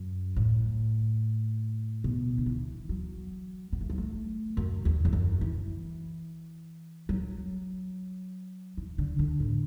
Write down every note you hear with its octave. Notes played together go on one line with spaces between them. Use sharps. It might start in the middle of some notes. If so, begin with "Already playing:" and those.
Already playing: F#2
A2
B2
D3
E3
F#3
B3
A3
F#3
A3
F#2
E2
E2
F#2
E3
F#3
E3
D3
D3
A2